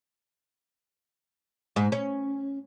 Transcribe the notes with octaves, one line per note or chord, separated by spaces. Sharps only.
G#2
C#4